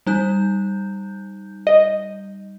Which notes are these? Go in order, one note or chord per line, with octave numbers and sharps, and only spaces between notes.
G3 D#4 G6
D#5